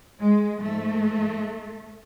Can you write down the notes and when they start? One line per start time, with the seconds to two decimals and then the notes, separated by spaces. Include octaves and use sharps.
0.19 G#3
0.60 G#2 F3 A3